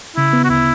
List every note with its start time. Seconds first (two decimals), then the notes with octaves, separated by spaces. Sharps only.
0.16 C#3 E4
0.33 B3
0.44 F#4
0.50 D2 E4